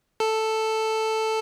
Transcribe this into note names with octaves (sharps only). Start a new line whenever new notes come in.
A4